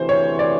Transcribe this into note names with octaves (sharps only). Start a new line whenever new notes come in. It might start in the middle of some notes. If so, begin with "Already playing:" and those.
Already playing: D2 C3 E3 C5
C#5
D5